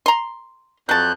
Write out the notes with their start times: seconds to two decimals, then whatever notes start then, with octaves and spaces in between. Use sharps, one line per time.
0.06 A#5 C6
0.89 F2 F#3 A5 F#6 G6